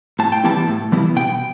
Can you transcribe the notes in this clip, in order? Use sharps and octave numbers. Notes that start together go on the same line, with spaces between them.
A2 A5
G5
E3 G3 B3 E4 A5
A2
E3 G3 B3 E4
B2 G5